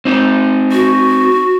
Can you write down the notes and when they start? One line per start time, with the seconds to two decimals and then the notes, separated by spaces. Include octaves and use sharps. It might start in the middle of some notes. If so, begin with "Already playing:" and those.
0.05 C4 D#4
0.72 F#4